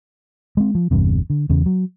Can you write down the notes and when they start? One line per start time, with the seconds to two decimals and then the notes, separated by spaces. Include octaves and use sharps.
0.57 G#3 C4
0.75 F3
0.91 G1 E2 G2 C3
1.30 D3
1.50 E2 C#3
1.66 F#3